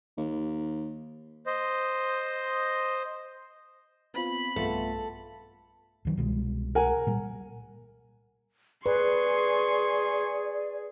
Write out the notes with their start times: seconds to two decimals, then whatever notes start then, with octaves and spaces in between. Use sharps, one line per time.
0.17 D#2
1.46 C5 D#5
4.14 B3 C4 F4 B5
4.56 B1 G2 A3 B3 F4 A4 B4
6.05 D2 D#3 F#3
6.17 C2 B2 G#3
6.75 A#4 F#5 G#5
7.07 A#2 G3
8.86 G#4 B4 D5 C6 C#6